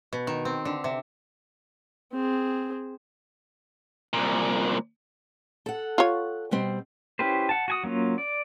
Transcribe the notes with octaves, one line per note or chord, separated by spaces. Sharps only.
B2
D#3
C4
D3
C3
C4 G#4
C2 A#2
A4 F#5
F4 C#5
B2 G3 C4
C#4 E4 G4 B4 C5
F#5 A5
F#4 G#5 D#6
F#3 A#3 C#4 F4
D5